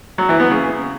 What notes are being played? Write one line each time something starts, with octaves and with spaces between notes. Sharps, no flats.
F#3
E3
B3
C#3